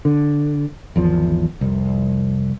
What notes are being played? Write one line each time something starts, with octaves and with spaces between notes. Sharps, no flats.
D3
G#1 E2 F3
F1 C2